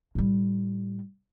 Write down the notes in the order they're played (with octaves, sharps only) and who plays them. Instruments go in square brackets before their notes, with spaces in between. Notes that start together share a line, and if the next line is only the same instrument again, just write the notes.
[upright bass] A2 G3